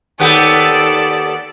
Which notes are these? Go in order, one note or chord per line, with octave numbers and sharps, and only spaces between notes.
D#2 B3 G4 A4 D5